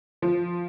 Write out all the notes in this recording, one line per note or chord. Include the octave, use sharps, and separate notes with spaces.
F3